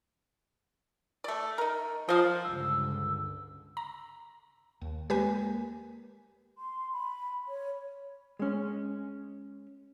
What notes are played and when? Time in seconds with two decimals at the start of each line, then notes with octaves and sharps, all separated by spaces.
1.24 A3 D5
1.58 D#4 A#4
2.09 F3 D#5 F5
2.44 C#2 G2 D3 E6
3.77 A#5
4.81 D#2
5.10 G#3 A#3 G4 B4 G#5
6.58 C6
6.93 B5
7.48 C#5
8.39 G#3 C#4